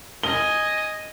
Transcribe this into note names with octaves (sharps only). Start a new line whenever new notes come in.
D#5 G#5 G7